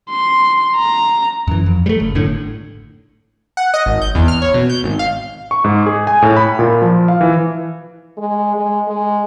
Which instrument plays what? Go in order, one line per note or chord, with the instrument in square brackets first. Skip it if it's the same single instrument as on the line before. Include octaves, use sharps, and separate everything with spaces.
[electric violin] C6
A#5
[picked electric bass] F#2 E3
F2
G3 A3
F#1
G#1 A2 D3
[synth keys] F#5
D#5
G#1
G6
E2
F6
C#5
B2
G6
G#1
F5
[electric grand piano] C#6
G#2
G#4
G#5
A2
B5
A#2
F3
F5
E3
[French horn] G#3
G#3
G#3